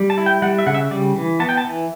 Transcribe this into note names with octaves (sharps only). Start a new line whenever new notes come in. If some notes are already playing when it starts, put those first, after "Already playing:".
Already playing: G3
A5
E4
G5
G3 F#5
E5
C#3 F#5
E5
G3 D5
E3
B3 A5
G5
A5
E3